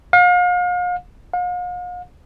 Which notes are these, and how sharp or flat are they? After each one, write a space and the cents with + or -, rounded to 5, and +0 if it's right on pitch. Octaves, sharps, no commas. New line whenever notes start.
F5 +40
F5 +45